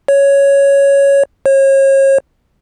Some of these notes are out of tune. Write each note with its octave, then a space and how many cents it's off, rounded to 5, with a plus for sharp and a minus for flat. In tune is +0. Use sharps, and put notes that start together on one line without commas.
C#5 +5
C#5 -35